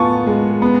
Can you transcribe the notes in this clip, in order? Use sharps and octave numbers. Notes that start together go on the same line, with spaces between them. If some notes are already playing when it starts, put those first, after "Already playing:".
Already playing: A2 B3 F4 G#5 A5 C#6
G#3
B3